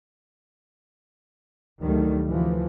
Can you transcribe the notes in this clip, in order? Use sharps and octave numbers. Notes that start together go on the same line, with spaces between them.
D2 D#3 F#3 G3 A3
D2 C3 E3 F3